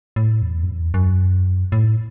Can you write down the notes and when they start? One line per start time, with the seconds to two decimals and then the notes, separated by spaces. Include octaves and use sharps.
0.16 A2
0.42 E2
0.63 F#2
0.68 E2
0.94 F#2
1.72 A2